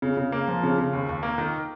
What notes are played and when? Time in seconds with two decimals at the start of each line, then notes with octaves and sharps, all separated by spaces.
0.02 C#3
0.17 C#3
0.32 A#3
0.48 F3
0.63 C#3
0.78 C#3
0.93 D#2
1.09 D#2
1.23 A#3
1.38 D#3